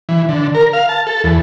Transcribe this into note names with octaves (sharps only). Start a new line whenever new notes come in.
E3
D3
A#4
F5
A5
A4
E2